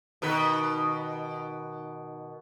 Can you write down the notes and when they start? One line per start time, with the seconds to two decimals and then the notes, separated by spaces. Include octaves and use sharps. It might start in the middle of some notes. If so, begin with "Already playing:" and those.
0.22 B2 D#3 B4